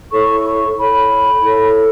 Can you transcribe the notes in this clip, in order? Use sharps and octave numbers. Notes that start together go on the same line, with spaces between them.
E4 A4 C#5 C#6
C#6
E4 A4 C#5 B5
E4 A4 C#5